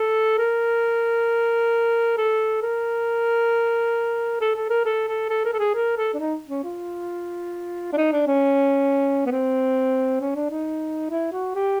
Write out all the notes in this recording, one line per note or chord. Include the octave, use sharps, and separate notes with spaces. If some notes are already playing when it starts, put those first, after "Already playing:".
Already playing: A4
A#4
A4
A#4
A4
A4
A#4
A4
A4
A4
A#4
A4
G#4
A#4
A4
D4
D#4
C#4
F4
D4
D#4
D4
C#4
B3
C4
C#4
D4
D#4
E4
F#4
G4